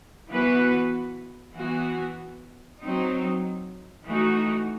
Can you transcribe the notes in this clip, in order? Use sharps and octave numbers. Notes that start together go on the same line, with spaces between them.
E3 B3 F#4 B4
E3 B3 F#4
F#3 C4 D#4
E3 A3 D#4 F#4